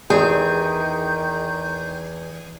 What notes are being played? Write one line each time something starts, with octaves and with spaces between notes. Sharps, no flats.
E2 D#3 G#4 G6